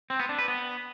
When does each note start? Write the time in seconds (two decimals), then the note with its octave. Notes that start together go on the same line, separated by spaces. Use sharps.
0.10 C4
0.20 B3
0.29 D4
0.39 B4
0.48 B3